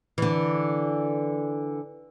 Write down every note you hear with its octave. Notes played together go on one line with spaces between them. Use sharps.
D3 E3